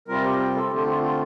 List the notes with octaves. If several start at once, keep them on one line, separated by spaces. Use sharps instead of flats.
C3 G3 C4 F4 A#4
G4
G4
A4
D3 A3 C4 F4 G4
F4
F4